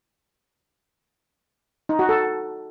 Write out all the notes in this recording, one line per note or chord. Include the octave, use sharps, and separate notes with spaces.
D#4
F#4
A4